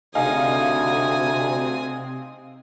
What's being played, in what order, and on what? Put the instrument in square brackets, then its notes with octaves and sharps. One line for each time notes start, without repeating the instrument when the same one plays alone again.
[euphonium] D2 [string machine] C3 C4 [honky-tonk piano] D#4 G#4 F5 [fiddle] G#5 D#6